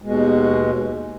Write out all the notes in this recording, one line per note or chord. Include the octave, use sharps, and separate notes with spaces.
D#2 B2 G#3